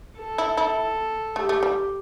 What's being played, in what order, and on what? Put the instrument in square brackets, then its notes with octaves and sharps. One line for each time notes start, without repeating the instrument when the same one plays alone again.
[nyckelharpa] A4
[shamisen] E4
E4
[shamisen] A3 [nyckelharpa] G4
[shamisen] A3
G3